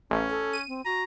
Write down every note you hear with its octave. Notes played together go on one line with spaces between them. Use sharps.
A1 C#4
A4
D#7
C4
F#4 A#5